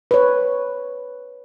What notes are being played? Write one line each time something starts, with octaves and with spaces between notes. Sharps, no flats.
B4 C#5